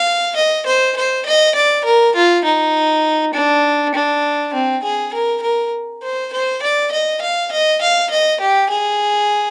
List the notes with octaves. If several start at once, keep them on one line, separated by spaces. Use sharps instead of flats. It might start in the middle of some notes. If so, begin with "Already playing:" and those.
Already playing: F5
D#5
C5
C5
D#5
D5
A#4
F4
D#4
D4
D4
C4
G#4
A#4
A#4
C5
C5
D5
D#5
F5
D#5
F5
D#5
G4
G#4